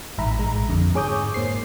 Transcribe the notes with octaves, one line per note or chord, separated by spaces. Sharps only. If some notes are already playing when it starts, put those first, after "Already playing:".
A1 G#2 E5 A#5 B5
A#1 G#3 A#5
F2 D3
G#2 G#4 C#5 D6 D#6 G6
G#2 A#3 C5 C7